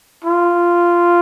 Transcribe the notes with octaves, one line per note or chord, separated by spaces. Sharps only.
F4